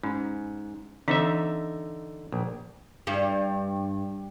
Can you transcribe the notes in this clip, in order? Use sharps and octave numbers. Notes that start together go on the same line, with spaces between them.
G#2 C#4
D3 E3 C4 D#4 C5 E5
A#1
G2